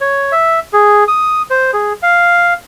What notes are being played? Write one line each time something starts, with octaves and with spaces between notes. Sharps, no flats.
C#5
E5
G#4
D#6
C5
G#4
F5